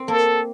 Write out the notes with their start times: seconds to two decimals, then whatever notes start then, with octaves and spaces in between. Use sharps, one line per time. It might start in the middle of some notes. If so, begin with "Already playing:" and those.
Already playing: C4
0.08 A#3 A4